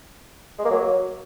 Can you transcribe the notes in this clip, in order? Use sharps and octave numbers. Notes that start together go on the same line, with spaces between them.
G#3
A#3
F#3